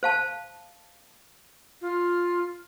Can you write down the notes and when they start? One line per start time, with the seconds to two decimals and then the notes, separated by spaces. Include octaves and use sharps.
0.03 C5 F5 A5
1.81 F4